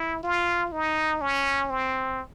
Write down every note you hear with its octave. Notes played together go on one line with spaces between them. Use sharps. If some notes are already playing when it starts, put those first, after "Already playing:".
Already playing: E4
F4
D#4
C#4
C4